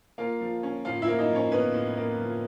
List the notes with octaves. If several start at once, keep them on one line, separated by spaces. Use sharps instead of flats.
A#3 F4 F5
F3
C#4
A2 F4 F5
E4 E5
A#3
D#4 D#5
F3
C#4 C#5
B3 C#4 B4
A2
A#3
F3